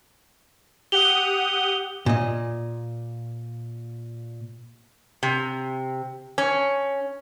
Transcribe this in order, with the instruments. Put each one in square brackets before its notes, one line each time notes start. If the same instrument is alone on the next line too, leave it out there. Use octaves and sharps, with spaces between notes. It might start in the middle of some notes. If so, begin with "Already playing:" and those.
[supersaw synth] G4 F#5 D#6 [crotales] F7 G7
[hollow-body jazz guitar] A#2 D#5
[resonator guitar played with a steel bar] C3
C#4